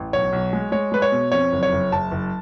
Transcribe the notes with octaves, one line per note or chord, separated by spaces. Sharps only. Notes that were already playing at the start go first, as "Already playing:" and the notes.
Already playing: A1
B1 C#5
B1
G#3
G#3 C#5
G#3 B4
C#5
B2
F2 C#5
F#1
C#5
F#1
F#1 A5
F#1